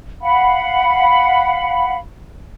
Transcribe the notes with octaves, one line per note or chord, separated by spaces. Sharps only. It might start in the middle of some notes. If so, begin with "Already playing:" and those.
F5 F#5 B5